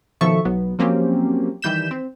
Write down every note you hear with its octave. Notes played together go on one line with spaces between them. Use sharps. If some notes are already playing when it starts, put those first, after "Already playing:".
B2 D#3 F3 A4 E5 C#6
B1 F#3 B3
F3 F#3 A#3 C4 C#4 G4
D#3 E3 G3 G6 B6 E7
C4